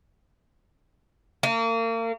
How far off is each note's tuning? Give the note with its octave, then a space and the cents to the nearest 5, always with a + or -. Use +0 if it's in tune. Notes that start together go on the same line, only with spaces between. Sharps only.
A#3 -35